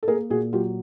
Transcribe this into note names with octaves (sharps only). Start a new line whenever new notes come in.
A4
A#3 G#4 A#4
A#2 F#4 G#4
F#3 F4 G4